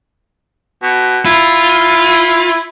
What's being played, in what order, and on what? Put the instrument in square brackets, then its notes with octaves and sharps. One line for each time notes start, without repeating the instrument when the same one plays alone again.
[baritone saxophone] B2
[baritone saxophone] E4 [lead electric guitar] F4